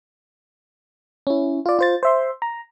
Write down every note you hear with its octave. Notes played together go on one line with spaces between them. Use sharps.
C#4 E4
F4 D5
F4 C5 A6
C5 E5 C6
A#5